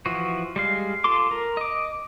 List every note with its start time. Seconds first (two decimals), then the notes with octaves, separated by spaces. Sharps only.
0.06 E3 F3 F#4
0.56 G3 G#3 F5
1.04 F4 A4 C6 D6
1.31 A#4
1.57 D#5 D6